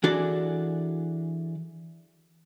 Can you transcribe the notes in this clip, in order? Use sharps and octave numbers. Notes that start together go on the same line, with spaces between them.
E3 D4 F#4 G#4 A4 D5